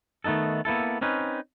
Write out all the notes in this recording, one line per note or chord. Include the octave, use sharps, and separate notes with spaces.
D#3 A3 B3 D#4 A4
A#3 B3 E4 A4
C4 C#4 D#4 B4